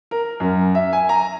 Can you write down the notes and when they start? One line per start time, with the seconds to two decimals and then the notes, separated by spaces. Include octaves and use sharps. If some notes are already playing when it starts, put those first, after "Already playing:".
0.11 A#4
0.40 F#2
0.75 E5
0.93 G#5
1.09 A#5